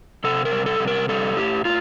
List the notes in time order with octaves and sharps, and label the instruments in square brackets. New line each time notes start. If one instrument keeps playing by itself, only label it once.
[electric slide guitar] C3 A4
A#4
G3
A4
C3
A#4
G3 A4
A2 G4
A2 F4